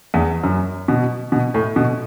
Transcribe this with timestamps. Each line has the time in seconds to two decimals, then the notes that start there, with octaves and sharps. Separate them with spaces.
0.14 E2
0.43 F#2
0.88 B2
1.32 B2
1.54 A2
1.76 B2